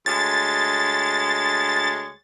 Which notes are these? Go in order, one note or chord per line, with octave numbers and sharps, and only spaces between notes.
D2 G#3 C#5 A6